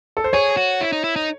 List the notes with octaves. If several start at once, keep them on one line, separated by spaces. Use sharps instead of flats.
A4
C5
G#4 C#5
F#4
E4
D#4
E4
D#4